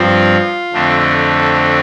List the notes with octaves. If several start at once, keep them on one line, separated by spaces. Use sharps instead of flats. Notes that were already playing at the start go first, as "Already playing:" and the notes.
Already playing: G2 F3 C4 F4
F2 D3 A3 C4